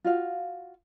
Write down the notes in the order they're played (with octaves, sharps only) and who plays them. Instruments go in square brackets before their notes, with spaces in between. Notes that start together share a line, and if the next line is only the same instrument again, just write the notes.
[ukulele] F4 F#4 F5